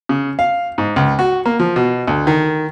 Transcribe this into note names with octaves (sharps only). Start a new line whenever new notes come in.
C#3
F5
G#2
C#2
F#4
A#3
F3
B2
D2
D#3